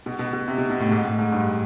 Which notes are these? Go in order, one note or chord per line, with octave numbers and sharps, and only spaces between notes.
B2
B2
B2
C3
B2
B2
A2
G#2
A2
G#2
G2